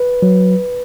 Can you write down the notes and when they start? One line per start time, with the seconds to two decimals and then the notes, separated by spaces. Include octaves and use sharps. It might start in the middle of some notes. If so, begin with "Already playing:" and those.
Already playing: B4
0.22 F#3